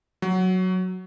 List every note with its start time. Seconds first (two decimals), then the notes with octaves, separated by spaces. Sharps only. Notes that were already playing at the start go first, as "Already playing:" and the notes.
0.22 F#3